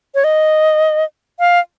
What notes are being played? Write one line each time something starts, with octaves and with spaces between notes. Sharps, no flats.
C#5
D#5
F5